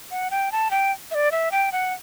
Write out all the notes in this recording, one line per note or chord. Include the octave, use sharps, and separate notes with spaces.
F#5
G5
A5
G5
E5
D5
E5
G5
F#5